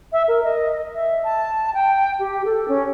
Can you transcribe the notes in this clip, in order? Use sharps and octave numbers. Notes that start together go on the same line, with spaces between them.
E5
A#4
D#5
E5
A5
G5
G4
A4
C#4